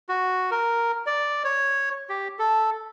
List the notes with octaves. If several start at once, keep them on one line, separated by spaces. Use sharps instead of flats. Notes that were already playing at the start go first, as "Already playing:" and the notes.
F#4
A#4
D5
C#5
G4
A4